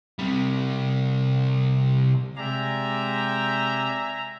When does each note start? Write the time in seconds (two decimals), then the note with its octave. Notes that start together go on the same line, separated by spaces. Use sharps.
0.19 C3 G3
2.37 C3 G#3 D5 E5 G5 G#5 A#5